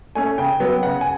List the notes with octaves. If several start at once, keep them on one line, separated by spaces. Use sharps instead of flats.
A3 C#4 G#5
C#3 G5
F#3 B3
C#3 F#5
G#5